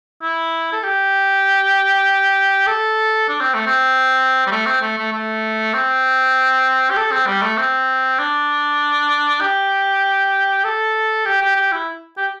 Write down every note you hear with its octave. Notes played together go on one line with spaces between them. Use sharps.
E4
A4
G4
A4
D4
C4
A3
C4
G3
A3
C4
A3
A3
A3
C4
G4
A4
C4
G3
A3
C4
D4
G4
A4
G4
G4
G4
E4
G4